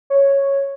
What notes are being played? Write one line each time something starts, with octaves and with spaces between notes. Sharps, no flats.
C#5